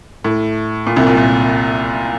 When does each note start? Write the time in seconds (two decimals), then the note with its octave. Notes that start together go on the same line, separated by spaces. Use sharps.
0.24 A2
0.87 A#2
0.96 C2 C3
1.07 A#2
1.17 A#2